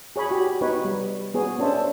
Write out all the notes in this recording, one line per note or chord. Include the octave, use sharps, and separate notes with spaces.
G#4 C#5 G#5 B5
F#4 G4
B3 D#4 B4 C#5
G3
B3 G#4 C#5
C#4 D4 A4 C5 E5